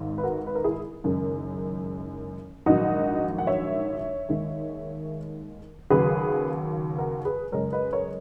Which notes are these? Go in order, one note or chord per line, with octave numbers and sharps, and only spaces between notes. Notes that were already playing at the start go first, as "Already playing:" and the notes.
Already playing: G#1 G#2
B4
F#4 A#4
B4
A#4
E4 G#4
F#1 F#2 D#3 G#3
A#1 G#2 D#3 F#3 D#4 F#4
F#5
C#5 E5
D#2 D#3 G#3
D#2 C#3 F#3 G#4 B4
F#4 A#4
G#4 B4
F#2 C#3 G#3 A#4 C#5
B4 D#5
A#4 C#5